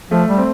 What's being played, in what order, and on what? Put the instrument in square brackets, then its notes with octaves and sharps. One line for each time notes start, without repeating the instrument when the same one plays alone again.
[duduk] F3 [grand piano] A3
[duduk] G3
[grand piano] C4